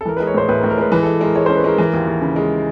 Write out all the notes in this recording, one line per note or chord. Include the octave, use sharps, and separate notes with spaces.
A4
E3 A#4
B4
G#3
C#5
A2 C5
A2 B4
A#4
A2
A#4
G#3 B4
E3 B4
A4
G#3
G#3 A#4
G#3 C#5
C5
C#4
B4
G#3 A#4
E3 A#4
D#2
D#2
C#3
G#3